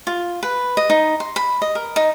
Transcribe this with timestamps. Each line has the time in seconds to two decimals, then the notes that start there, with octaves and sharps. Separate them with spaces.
0.07 F4
0.43 B4
0.77 D#5
0.90 D#4
1.20 C6
1.36 B5
1.62 D#5
1.75 A#4
1.96 D#4